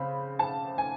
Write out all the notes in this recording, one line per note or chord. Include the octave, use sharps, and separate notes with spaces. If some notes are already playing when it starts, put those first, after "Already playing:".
Already playing: C#3 C4 B5
A5
G#5